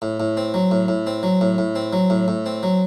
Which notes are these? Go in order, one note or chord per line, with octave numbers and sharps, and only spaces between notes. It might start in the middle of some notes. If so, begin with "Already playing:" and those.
A2
A2
C4
F#3
A2
A2
C4
F#3
A2
A2
C4
F#3
A2
A2
C4
F#3